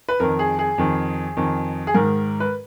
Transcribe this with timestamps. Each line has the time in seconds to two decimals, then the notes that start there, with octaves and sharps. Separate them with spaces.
0.09 B4
0.20 F2 D#3 A#4
0.39 G#4
0.59 G#4
0.78 F2 D#3
1.37 F2 D#3
1.87 G#4
1.94 G#2 D#3 A#4
2.40 B4